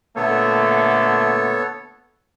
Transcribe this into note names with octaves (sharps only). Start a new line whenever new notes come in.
A#2 D3 A3 B3 A4 C#5